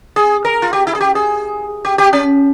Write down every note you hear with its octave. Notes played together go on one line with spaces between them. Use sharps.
G#4
A#4
F4
G4
E4
G#4
G4
G#4
G4
G4
C#4